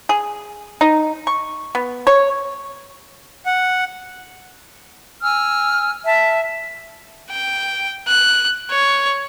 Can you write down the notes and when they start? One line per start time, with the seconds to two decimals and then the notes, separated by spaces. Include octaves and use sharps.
0.09 G#4
0.81 D#4
1.27 C#6
1.75 B3
2.07 C#5
3.46 F#5
5.22 G#5 E6 F6
6.05 E5 A5
7.31 G5
8.08 F#6
8.71 C#5